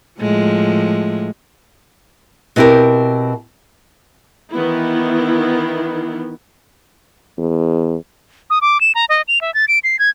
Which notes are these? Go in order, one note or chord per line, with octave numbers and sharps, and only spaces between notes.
A2 F3 G#3
B2 C4 E4 G4 A#4
D#3 E3 B3 E4
E2
D#6
D6
E7
A#5
D#5
F7
E5
A6
D7
C7
G#6